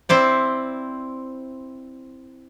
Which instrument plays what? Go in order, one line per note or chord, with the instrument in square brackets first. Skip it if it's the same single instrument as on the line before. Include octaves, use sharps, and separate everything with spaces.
[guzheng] C4 E4 C5 D5